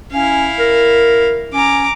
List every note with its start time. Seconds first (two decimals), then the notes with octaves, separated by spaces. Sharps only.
0.13 C#4 E4 F5
0.59 A#4
1.54 C#4 A#5 D6